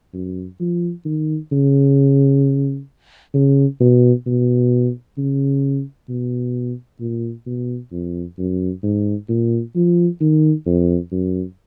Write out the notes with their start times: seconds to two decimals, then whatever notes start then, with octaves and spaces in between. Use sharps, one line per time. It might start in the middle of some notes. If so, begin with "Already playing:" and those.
0.14 F#2
0.60 F3
1.06 D#3
1.52 C#3
3.34 C#3
3.80 B2
4.26 B2
5.18 C#3
6.09 B2
7.00 A#2
7.46 B2
7.92 F2
8.39 F#2
8.83 G#2
9.29 A#2
9.76 F3
10.21 D#3
10.66 F2
11.12 F#2